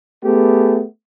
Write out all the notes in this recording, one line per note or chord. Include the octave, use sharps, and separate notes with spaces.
A3 B3 G4 G#4